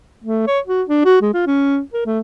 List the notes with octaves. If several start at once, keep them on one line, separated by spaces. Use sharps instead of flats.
A3
C#5
F#4
D4
F#4
G#3
F4
C#4
A#4
A3